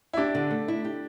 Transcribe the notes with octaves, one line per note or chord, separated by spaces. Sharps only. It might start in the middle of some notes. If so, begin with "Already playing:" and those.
E4
D4 G4
D3
A3
E4
G4